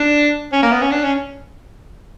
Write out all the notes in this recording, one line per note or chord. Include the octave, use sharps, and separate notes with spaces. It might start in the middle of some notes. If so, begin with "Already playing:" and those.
Already playing: D4
C#4
A#3
B3
C#4
D4
C#4